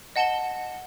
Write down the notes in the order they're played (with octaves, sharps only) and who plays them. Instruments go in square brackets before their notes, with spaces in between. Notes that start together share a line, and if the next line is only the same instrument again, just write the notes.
[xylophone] D#5 F#5 A5 C#7 E7 G7